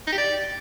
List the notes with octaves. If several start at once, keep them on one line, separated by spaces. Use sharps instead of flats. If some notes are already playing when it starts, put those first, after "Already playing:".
D#4
G4
D5